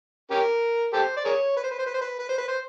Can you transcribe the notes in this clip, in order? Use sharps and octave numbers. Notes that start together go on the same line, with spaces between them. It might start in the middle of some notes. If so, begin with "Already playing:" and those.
C#4 G4 A#4
G4 A4 C5
D5
G#4 A#4 C#5
B4
C5
B4
C5
B4
C5
B4
B4
C5
B4
C5